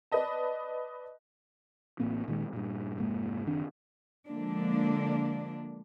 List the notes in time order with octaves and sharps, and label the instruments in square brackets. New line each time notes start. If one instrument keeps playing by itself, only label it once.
[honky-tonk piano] B4 D5 D#5 A5
[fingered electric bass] A1 A2 A#3 C4
A#2 D#3 G#3
G2 A#2
F1 G#2 G#3 A#3
F#1 D#3 C4 D4
[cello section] D3 F3 G#3 A#3 D4